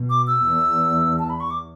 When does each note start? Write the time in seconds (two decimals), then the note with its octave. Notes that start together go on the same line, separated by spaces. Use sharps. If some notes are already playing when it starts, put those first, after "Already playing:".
Already playing: B2
0.10 D6
0.27 E6
0.45 E2
1.19 A5
1.30 B5
1.40 C#6
1.51 D6